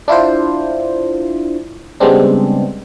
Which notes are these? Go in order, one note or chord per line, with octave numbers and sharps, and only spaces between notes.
D4 E4 F4 C5
C#3 G3 G#3 B3 C4 D4